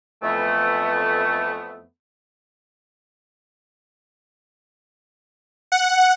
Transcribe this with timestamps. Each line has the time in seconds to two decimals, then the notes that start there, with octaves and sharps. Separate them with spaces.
0.23 F2 E3 A3 B3
5.72 F#5